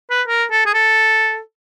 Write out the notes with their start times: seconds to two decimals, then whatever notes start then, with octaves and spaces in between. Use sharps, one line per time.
0.10 B4
0.28 A#4
0.51 A4
0.66 G#4
0.74 A4